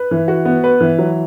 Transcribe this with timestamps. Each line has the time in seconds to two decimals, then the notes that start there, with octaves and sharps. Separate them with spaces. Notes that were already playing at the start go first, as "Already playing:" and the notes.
Already playing: B4
0.11 E3
0.28 F#4
0.45 B3
0.64 B4
0.81 E3
0.99 F#3